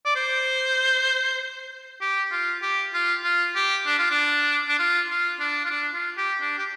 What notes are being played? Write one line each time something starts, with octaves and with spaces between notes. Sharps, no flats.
D5
C5
G4
F4
G4
F4
F4
G4
D4
F4
D4
D4
F4
F4
D4
F4
D4
F4
G4
D4
G4